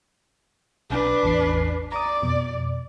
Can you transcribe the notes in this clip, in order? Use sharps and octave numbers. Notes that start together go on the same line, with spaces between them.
B1 D4 B4
A1 E2 C7
D5 A#5 D#6
F2 B2